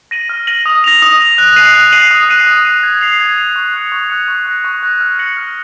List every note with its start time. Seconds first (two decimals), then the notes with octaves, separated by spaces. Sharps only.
0.11 A#6 D#7 F#7
0.29 F6
0.47 A#6 D#7 F#7
0.66 D#6
0.84 A#6 F7
1.02 D#6
1.20 A#6 F7
1.38 F#6
1.56 C7 D#7 F#7
1.74 F#6
1.92 C7 D#7 F#7
2.11 D#6
2.29 F#6 C7 D#7
2.47 D#6
2.65 F#6 C7 D#7
2.83 G#6
3.01 C7 F7
3.19 G#6
3.38 C7 F7
3.56 C#6
3.74 F#6 C#7
3.92 C#6
4.10 F#6 C#7
4.28 C#6
4.46 F#6 A#6
4.64 C#6
4.83 F#6 A#6
5.01 F6
5.19 A#6 C#7 F#7
5.37 F6